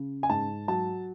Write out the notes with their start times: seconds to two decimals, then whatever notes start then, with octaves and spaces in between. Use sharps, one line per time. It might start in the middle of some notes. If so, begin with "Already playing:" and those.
Already playing: C#3
0.23 G#5
0.29 G#2 A5
0.68 F#3 A5